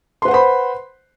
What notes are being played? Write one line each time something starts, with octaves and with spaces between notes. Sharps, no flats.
B4 C5 F#5 B5 C6